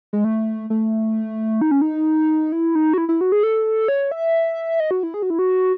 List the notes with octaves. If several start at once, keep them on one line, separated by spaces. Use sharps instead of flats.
G#3
A3
A3
D#4
C#4
D#4
E4
D#4
F#4
E4
E4
F#4
G#4
A4
C#5
E5
D#5
F#4
E4
G#4
F#4
E4
F#4